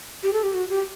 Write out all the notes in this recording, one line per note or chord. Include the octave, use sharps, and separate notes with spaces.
G4
A4
G4
F#4
G4